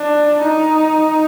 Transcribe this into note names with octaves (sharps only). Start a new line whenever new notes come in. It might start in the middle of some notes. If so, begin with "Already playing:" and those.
Already playing: D4
D#4